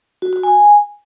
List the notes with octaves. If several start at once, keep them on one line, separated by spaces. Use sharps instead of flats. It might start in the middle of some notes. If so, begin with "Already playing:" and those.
F#4
F#4
G#5